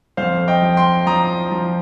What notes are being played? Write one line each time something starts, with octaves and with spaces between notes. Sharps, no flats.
F2 C5 F5
D#5 G5
F3
G5 C6
F3 A#5 D#6
F3